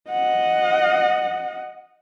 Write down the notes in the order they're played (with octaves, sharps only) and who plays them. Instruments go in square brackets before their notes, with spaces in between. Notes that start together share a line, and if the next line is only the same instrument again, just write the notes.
[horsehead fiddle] D#5 F#5